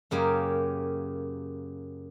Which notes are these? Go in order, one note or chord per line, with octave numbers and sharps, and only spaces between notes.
F#2 C#3 A#3 G4